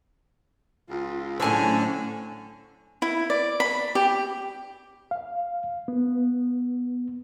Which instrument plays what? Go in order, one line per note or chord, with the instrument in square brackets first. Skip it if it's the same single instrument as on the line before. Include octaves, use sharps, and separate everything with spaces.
[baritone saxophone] C#2 [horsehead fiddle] F4
[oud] A2 F#3 C4 [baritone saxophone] D3 [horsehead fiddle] C#4 [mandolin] G#5 C#6 E6
[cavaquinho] E4
D5
B5
G4
[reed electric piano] F5
B3